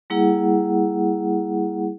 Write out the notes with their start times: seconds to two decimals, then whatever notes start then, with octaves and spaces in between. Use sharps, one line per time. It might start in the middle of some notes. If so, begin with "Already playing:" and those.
0.10 G3 A#3 E4 G#4 F#5